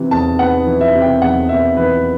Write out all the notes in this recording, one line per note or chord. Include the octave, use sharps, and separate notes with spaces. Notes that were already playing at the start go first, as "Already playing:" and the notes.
Already playing: C3 E3
E2 A5
B3 F#5
E3
E5
C3
G5
E2 F#5
B3 E5
E3 B4